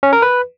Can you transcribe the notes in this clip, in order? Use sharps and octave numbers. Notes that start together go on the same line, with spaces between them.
C#4
A#4
B4